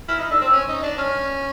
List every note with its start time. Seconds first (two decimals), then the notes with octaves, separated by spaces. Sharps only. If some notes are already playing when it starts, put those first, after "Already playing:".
0.08 E4 F6
0.19 D#4
0.31 D4 E6
0.42 C4
0.53 C#4
0.69 D#4
0.83 D4
0.98 C#4 F6